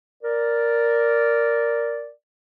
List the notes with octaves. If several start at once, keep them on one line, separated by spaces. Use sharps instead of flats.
A#4 D5